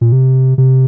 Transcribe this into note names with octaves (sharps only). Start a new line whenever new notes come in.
A#2
C3
C3